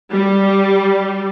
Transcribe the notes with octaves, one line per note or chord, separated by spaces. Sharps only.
G3